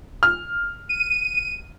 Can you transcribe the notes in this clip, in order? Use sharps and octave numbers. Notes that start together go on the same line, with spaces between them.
F6
D#7